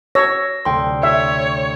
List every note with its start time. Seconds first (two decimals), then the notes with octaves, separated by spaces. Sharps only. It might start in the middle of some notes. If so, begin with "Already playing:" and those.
0.15 C#5 E6 A#6
0.65 D2 C3 G5 C6
1.03 C#5 E5